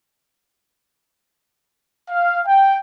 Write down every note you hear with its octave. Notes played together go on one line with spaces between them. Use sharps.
F5
G5